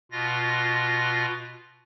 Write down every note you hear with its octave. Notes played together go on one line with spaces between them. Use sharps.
B2 F4 A#6